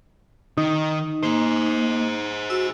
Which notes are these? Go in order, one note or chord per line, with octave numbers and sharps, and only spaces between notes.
D#3 D#4
A#3 G#4 C5
F#4 E6